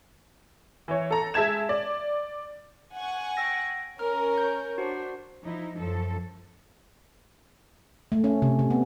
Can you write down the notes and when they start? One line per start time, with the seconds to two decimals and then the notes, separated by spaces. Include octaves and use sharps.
0.88 E3 C#5
1.11 A4 A#5
1.34 G#3 E5 A5 G#6 E7
1.69 D5
2.94 F#5 G#5 C#6
3.37 G5 E6 A#6
3.99 C#4 A#4 C#5 F6
4.38 G6
4.78 D4 F#4 C5
5.43 F3 D#4 E4
5.77 F#2 F3 A4
8.12 A3
8.24 C#4
8.42 C3
8.59 C3
8.70 B3